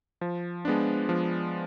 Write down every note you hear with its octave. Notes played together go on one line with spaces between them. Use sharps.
F3
G#3 B3 D4
F3